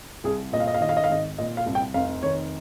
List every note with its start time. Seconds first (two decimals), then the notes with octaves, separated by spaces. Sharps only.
0.24 C2 G#4
0.53 A#2 D#5
0.60 F5
0.67 D#5
0.74 F5
0.81 D#3 D#5
0.89 F5
0.97 D#5
1.04 F5
1.10 G#1 D#5
1.38 A#2 D#5
1.57 F5
1.66 C2
1.75 G5
1.94 F1 F5
2.23 D#3 C#5